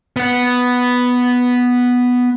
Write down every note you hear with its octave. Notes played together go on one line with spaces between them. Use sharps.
B3 F#5